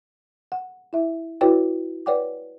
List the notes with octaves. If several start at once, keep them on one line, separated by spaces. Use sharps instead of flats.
F#5
E4 E5
E4 F#4 B4 C#5 D#5 G5
B4 C#5 D5 F#5 G5 D6